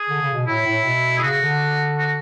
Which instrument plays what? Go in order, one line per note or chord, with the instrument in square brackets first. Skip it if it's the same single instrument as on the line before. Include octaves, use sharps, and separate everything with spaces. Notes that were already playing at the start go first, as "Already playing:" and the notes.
Already playing: [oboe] G#4
[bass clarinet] D3
C#3
B2
[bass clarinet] A2 [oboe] E4
[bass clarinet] A2
B2
[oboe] G#4
[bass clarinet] C#3 [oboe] F#4
[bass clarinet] D3
[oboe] F#4